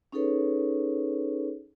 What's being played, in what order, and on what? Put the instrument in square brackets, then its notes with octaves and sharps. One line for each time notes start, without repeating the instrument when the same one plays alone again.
[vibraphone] C#4 D#4 G#4 A4 B4 C#5